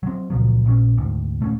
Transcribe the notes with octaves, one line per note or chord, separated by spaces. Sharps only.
F#3 C4
C#2 A#2 F3 F#3
A#1 A#2 C#4
D2 G#2
D#1 A3 A#3 C#4